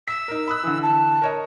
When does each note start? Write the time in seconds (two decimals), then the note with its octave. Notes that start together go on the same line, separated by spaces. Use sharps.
0.08 E6 B6
0.28 D#4 A#4
0.47 B5 D#6 F#6
0.63 D3 E3
0.83 A5
1.22 A#4 C#5 D#5